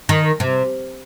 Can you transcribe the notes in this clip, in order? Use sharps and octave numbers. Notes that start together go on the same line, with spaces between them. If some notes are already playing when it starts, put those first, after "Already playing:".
D#3
C3